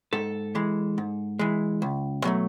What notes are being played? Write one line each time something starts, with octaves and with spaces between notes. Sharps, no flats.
G#2 A4
E3 G#3
G#2
E3 G#3
C#2
B2 F#3 A3